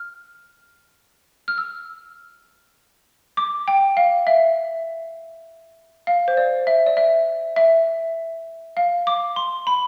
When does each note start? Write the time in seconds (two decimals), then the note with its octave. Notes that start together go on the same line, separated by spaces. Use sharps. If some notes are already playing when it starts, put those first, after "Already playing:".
Already playing: F6
1.48 F6
1.58 E6
3.37 D6
3.68 G5
3.97 F5
4.27 E5
6.07 F5
6.28 C5
6.37 D5
6.67 E5
6.87 D5
6.97 E5
7.56 E5
8.77 F5
9.07 D6
9.36 C6
9.67 B5